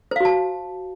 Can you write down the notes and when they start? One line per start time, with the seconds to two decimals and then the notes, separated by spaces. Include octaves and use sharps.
0.11 C5
0.16 F5
0.20 F#4
0.25 A5